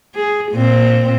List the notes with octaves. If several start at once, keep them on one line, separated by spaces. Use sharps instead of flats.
G#4
A#2 C4